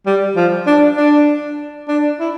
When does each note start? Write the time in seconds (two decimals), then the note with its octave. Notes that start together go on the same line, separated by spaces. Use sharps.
0.06 G3
0.36 F3
0.67 D4
0.97 D4
1.88 D4
2.20 E4